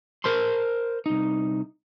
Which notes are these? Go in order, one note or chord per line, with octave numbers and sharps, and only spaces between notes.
A#4 C5 A5 C6
C2 D#4